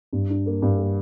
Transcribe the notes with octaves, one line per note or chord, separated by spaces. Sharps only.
G2
D4
A#3
G2
A#3